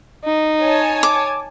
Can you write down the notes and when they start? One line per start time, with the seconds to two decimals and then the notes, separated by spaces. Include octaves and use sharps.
0.24 D#4
0.61 C#5 G#5 A5
1.03 D6